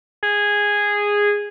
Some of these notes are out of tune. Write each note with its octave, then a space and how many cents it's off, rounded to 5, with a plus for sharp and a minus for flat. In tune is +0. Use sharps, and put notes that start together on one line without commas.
G#4 -10